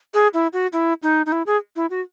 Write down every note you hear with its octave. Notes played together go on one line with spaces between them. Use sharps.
G#4
E4
F#4
E4
D#4
D#4
E4
G#4
E4
F#4